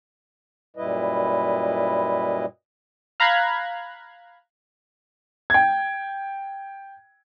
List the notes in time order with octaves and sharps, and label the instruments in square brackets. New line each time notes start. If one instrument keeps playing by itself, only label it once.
[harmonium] F#2 A#2 G3 E4 B4 D#5
[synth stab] F5 A#5 B5 F#6 G#6
[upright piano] G5 G#6